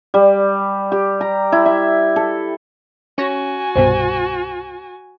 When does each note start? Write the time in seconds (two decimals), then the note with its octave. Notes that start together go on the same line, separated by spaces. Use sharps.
0.14 G3
0.92 G4
1.21 A#5
1.52 E4
1.66 E5
2.16 A4
3.18 C#4 F#4 C#5 G#5 A#6
3.75 C2 G2 B2 C5